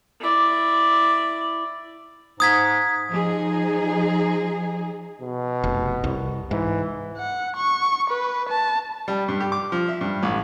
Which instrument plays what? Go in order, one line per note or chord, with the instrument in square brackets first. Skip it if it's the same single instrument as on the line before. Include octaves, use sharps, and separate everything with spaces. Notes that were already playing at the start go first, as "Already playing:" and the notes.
[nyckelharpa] E4 D5
[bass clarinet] G#2 [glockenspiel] D#6 G#6 B6
[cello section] F3 D#4 G#4
[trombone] B2
[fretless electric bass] F1
C2
[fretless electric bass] G#2 [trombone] E3
[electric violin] F#5
C#6
B4
A5
[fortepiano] G3
G2
G4
D6
F3
E5
G2
A1